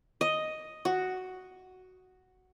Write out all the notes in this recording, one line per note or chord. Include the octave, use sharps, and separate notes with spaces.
D#5
F#4